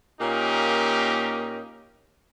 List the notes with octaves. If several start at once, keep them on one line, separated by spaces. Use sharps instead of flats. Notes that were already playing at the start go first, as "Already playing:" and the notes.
A#2 A#3 C#4 D#4 G4